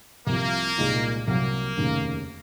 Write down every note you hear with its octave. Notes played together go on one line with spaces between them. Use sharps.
C2 C3 F3 A#3
C2 A#2 G#3 D#4
C2 C3 F#3 A#3
F1 D#2 C#3